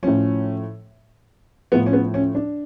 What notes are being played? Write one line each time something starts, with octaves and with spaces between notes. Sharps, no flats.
A2 F3 C#4
A2 F3 B3
C#4
B3
C#4
D4